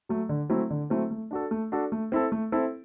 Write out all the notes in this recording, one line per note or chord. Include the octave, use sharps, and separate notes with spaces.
F#3 A3
D3
F#3 A3 C4 E4
D3
F#3 A3 C4 E4
A3
D4 F#4 A4
A3
D4 F#4 A4
A3
C4 E4 A4
A3
C4 E4 A4